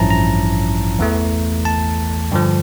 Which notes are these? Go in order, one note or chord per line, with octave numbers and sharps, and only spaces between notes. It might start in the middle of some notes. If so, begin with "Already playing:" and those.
Already playing: A1 G2 F3 C#4 E4 A5 A#5
A#5
E2 E3 A3
A5
G2 D3 F3